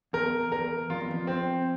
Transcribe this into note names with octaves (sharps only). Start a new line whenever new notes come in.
E2 A#4
E2 A#4
F2 F4
E2
F2
C4